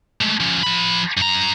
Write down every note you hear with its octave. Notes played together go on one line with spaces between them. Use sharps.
G#3 A3
F3 C#4
F3 B5
F#2 A#5